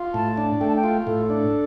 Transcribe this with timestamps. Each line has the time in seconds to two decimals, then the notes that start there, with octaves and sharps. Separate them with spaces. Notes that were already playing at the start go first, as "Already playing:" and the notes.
Already playing: F4
0.14 A2 A5
0.37 D4
0.60 A3 G5
0.68 A5
0.75 G5
0.84 F4
1.07 A2 A4
1.30 D4